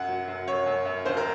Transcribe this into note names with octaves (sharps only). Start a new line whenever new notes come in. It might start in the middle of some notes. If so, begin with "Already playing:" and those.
Already playing: F#2 F#5
F#3
F#2
F#2 C#5
F#2
F#2
D#2 C5
A#4